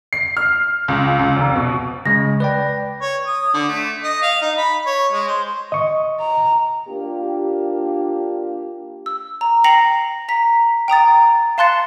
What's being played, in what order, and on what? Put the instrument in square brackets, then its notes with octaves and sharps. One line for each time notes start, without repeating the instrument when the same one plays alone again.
[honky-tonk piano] C7
F6
C#2
C#2
F1
B2
[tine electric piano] C#3 G#3 [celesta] A#6
[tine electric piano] B4 D5 G5
[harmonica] C#5
D#6
D3
A3
D#5
F5
D#4
B5
C#5
G#3
C5
[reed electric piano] D#5 C#6
[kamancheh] A#5
[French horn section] A#3 D4 F4 G4
[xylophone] E6
A#5
G5 A#6 C7 C#7 F7 F#7
A#5 B6
G5 A#5 D#6 A6
F5 A5 C6 F#6 A6 C#7